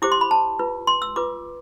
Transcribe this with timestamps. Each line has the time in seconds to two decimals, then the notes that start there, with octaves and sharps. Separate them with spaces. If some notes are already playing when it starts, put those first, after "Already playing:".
0.02 E4 G4 C5 D6
0.12 C6
0.21 B5
0.31 A5
0.59 F4 B4
0.87 C6
1.02 E6
1.16 F4 B4 D6